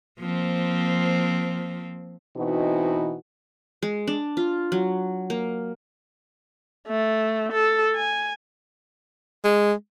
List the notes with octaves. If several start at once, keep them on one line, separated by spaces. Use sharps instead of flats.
F3 A#3 C4
B2 E3 C4 D#4 F#4
G#3
D4
F4
F#3
A#3
A3
A4
G#5
G#3